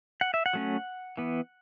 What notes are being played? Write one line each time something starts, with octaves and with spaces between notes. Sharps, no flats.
F#5
E5
F#5
F#3 A3 C#4
E3 B3